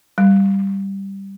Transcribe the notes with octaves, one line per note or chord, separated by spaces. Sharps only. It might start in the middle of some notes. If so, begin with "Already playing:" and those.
G3